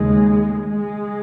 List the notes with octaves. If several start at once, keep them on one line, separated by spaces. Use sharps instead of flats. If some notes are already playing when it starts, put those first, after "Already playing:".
Already playing: D#2 C#3 G#3
G#3